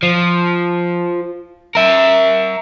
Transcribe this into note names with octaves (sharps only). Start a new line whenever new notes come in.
F3
A#4 E5